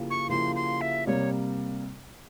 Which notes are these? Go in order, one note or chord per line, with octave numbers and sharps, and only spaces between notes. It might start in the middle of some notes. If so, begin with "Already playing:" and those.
Already playing: C#3 F3 A#3 E4 G4
C#6
C#3 F3 A#3 E4 G4 C6
C6
E5
C3 G3 A#3 C#5